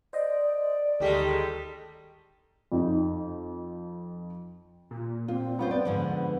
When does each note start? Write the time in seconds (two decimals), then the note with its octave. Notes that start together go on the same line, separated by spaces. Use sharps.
0.13 C5 D5 D#5
1.00 D2 D#3 G3 G#3 G4 A4 B6
2.72 F2 D#4
4.91 A#2 F4
5.28 A#2 C4 F4
5.59 B3 C#4 F4 C5
5.71 D5
5.85 G#2 D3 F3 F#5